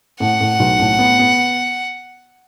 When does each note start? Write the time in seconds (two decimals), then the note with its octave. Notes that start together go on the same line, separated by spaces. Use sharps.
0.20 A2 F#5
0.40 A2
0.60 B1
0.79 A2
0.99 B3
1.19 B3